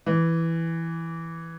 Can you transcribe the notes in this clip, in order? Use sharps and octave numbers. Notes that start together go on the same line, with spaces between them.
E3